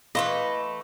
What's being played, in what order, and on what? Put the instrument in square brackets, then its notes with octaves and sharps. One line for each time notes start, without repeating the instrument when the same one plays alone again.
[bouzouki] E3 A3 B4 [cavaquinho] D#5 [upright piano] F5 C6